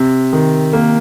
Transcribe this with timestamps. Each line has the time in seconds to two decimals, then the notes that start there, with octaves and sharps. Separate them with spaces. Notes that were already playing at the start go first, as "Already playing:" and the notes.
Already playing: C3
0.33 D#3
0.73 A#3